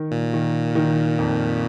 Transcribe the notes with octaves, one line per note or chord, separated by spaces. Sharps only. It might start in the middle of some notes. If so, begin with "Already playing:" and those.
Already playing: D#3
A#2
D#3
D#3
F2